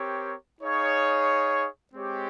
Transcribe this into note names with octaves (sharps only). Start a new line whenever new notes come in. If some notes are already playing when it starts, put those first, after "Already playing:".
Already playing: C4 G4 A#4 C#5
D#4 G#4 C#5 F5
G#3 C4 G4 C#5